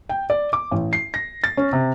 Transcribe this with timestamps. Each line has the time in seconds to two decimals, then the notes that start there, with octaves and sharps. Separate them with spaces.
0.09 G5
0.30 D5
0.53 D6
0.71 A1
0.93 C7
1.14 A#6
1.44 A6
1.57 C#4
1.73 C3